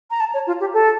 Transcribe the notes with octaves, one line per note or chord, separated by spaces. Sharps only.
A#5
A5
C#5
F4
G4
A4